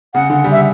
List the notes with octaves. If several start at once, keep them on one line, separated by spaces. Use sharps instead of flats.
C#3 F#5
D3
G3
E5